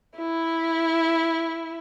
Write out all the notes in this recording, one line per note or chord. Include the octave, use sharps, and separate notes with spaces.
E4